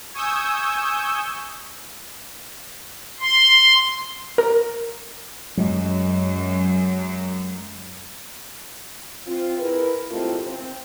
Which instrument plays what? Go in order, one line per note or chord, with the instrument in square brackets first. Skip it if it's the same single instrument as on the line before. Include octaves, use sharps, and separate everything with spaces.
[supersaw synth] G#5 C#6 D#6 E6 G6
[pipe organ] C6
[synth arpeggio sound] A#4
[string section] F#2 [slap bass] F#3 G#3
[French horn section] C4 F4
E4 G#4 A#4 B4
D#2 G#2 A3 C4 E4 F4
C4